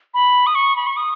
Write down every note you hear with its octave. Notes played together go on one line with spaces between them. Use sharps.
B5
D#6
C#6
B5
C#6
D#6